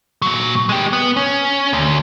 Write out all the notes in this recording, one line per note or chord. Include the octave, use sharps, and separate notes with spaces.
A#2 F#3
G#3 G4
B3
C#4
D2